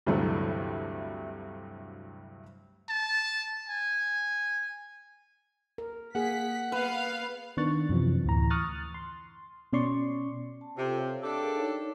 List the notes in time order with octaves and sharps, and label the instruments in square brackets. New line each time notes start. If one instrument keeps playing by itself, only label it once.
[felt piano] D2 G2 C3 E3 F#3 A3
[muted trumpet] A5
G#5
[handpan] A#4
[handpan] A#3 G#4 [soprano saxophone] F#5 [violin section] B6
[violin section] B3 F5 [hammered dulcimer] B4
[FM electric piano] D#3 B3 D4 C#6 F#6 A6
F#2 C3 E3 F3
D2 A2 E3 A#5
C#6 D#6 F6 F#6 A6
C6
B2 C#4 D5 C6 C#6
[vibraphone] A5
[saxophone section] C3 [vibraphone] F4 A4
[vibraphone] C#5 E5 F5
[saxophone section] D4 G4 A4
[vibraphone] G#4 A#4 F5
D#4 C#5 D5